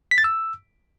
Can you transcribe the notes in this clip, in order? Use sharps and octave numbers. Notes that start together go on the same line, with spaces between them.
B6
A6
E6